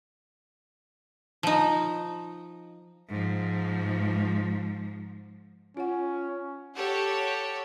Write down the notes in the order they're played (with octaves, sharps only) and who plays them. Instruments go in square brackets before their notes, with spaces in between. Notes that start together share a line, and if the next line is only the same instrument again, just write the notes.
[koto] F3 D#4
[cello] G#2 F3
[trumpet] C#4 [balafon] F4 C#5 F#5
[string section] G4 A4 C#5 F#5